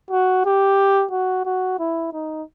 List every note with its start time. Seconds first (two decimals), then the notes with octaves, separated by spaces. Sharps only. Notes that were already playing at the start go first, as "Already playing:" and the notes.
0.11 F#4
0.45 G4
1.11 F#4
1.45 F#4
1.79 E4
2.13 D#4